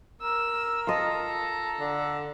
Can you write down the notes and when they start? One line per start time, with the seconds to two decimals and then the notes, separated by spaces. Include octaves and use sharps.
0.22 A#4 E6
0.87 F4 A4 D#5 A#5
1.80 D3